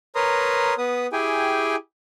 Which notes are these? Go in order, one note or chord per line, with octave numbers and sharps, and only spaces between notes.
A#4 B4 C#5 A#5 C6 D#6
B3 B4 D#6
E4 G4 G#4 G5 G#5